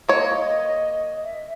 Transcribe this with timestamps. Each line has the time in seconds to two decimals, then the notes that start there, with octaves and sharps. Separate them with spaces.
0.09 A#3 C#5 D#5
1.24 E5